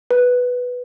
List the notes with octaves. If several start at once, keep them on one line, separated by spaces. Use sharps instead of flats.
B4